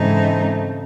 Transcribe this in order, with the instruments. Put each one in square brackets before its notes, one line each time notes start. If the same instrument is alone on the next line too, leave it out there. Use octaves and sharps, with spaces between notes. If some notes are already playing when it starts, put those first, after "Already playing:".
Already playing: [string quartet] G#2 E3 A3 C4 D#4 [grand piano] C#3